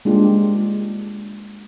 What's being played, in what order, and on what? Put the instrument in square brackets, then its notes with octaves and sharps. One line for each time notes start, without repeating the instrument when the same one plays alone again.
[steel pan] G#3 A#3 D4 F4 G4 G#4